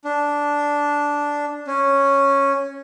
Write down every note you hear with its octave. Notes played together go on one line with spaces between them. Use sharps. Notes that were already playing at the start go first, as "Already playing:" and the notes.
D4
C#4